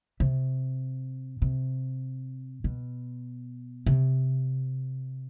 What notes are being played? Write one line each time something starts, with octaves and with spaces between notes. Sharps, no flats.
C3
C3
B2
C3